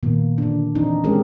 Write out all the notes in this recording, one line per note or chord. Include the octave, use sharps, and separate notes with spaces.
A#2 D#3 A#3 B3
D3 D4
E3 C4 D4 D#4
G#3 C4 C#4 G4 G#4 A#4